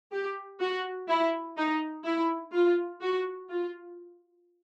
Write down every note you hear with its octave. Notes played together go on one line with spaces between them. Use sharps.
G4
F#4
E4
D#4
E4
F4
F#4
F4